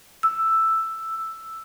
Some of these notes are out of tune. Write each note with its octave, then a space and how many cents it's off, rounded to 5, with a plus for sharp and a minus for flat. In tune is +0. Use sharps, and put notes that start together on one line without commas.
E6 +5